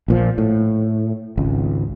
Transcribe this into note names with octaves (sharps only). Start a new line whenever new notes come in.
A#1 A#2 F3
A2
G#1 C#2